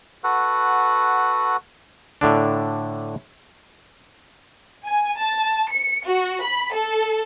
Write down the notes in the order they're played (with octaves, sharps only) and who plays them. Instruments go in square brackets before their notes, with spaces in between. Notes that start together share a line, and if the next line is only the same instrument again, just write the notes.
[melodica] F#4 A4 B4 F#5
[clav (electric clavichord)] A2 D3 D4
[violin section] G#5
A5
C#7
F#4
B5
A4